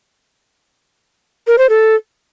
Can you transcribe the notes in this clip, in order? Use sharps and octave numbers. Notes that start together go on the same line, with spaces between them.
A#4
C5
A4